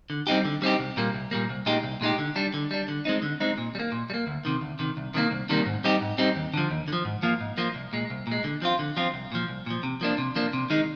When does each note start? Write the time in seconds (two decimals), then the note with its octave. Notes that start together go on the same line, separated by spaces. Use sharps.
0.10 D3
0.27 G3 C4 D#4 G4
0.45 D3
0.62 G3 C4 D#4 G4
0.79 C2
0.97 A#2 G3 A#3
1.14 C2
1.31 A#2 G3 A#3
1.49 C2
1.66 A#2 G#3 D#4 G4
1.83 C2
2.01 A#2 G#3 D#4 G4
2.18 D3
2.36 G3 D4
2.54 D3
2.71 G3 D4
2.88 D3
3.05 G#3 C4 D#4
3.22 D3
3.40 G#3 C4 D#4
3.58 A#2
3.75 G3
3.79 A#3
3.92 A#2
4.10 G3
4.14 A#3
4.27 D2
4.45 C3 D#3
4.61 D2
4.79 C3 D#3
4.97 C2
5.14 C3 D#3 G3 A#3
5.31 C2
5.49 C3 D#3 G3 A#3
5.66 G#2
5.84 G3 C4 D#4 G4
6.01 G#2
6.18 G3 C4 D#4 G4
6.36 D#2
6.54 D3 F3
6.71 D#2
6.88 D3
6.93 F3
7.05 G#2
7.23 F3 A#3 F4
7.41 G#2
7.57 F3 A#3 F4
7.75 C2
7.93 A#2 G#3
8.10 C2
8.27 A#2 G#3
8.44 D3
8.62 F3 C4 F4
8.79 D3
8.97 F3 C4 F4
9.14 C2
9.32 A#2 F3
9.48 C2
9.66 A#2 F3
9.83 C3
10.01 F3 A#3 D4
10.18 C3
10.36 F3 A#3 D4
10.53 C3
10.70 D#3 G#3 D#4